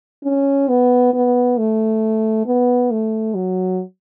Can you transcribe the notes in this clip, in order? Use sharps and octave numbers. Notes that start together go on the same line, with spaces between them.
C#4
B3
B3
A3
B3
A3
F#3